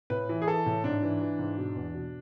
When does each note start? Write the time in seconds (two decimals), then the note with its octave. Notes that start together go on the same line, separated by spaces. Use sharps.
0.10 A2 B4
0.29 E3
0.42 G#4
0.47 E3 A4
0.66 A2
0.84 G#2 D4
1.02 E3
1.21 E3
1.39 G#2
1.57 B2
1.75 E2
1.94 B2